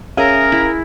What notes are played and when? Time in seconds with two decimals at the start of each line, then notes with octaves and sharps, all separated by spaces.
0.17 C#4 G#4 A#4 E5 F5
0.52 E4